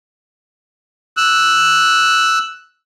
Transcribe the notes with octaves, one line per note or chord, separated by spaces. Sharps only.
E6 F#6